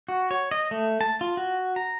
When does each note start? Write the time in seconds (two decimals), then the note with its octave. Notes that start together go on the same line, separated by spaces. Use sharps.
0.08 F#4
0.31 C#5
0.51 D#5
0.71 A3
1.01 A5
1.21 F4
1.37 F#4
1.76 A#5